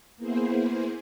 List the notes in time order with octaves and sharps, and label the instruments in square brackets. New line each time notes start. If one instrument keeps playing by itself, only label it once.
[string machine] A#3 B3 E4 G#4 C5